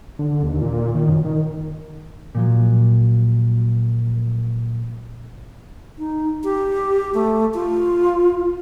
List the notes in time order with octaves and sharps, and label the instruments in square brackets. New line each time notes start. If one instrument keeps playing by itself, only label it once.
[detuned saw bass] D3
D#2
A#2
D#3
F#2
D#3
[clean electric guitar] A#2 F3 F#3
[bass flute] D#4
G4
A3
F4